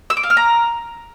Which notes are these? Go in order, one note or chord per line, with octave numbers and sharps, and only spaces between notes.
E6
D6
F5
F6
A#5